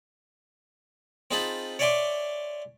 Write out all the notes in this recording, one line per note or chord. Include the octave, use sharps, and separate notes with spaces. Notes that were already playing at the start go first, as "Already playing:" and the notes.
C4 D#4 F4 G#4 A5 B5
C#5 D5 E5 G#5 C6 D6